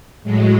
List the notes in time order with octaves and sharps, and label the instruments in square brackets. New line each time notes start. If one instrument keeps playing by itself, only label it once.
[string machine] A2 F#3 G#3